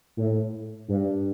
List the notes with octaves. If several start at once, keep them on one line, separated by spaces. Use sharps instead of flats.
A2
G2